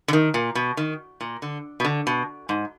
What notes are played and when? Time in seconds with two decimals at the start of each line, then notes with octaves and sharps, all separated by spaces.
0.08 D3
0.13 D#3
0.34 A#2
0.55 B2
0.77 D#3
1.21 A#2
1.42 D3
1.80 B2
1.85 D3
2.07 B2
2.49 G#2